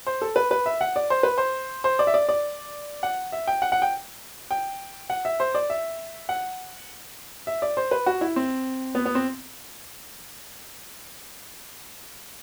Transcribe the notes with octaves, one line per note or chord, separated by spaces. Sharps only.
C5
A4
B4
B4
E5
F#5
D5
C5
B4
C5
C5
D5
E5
D5
D5
F#5
E5
G5
F#5
F#5
G5
G5
F#5
E5
C5
D5
E5
F#5
E5
D5
C5
B4
F#4
E4
C4
B3
B3
C4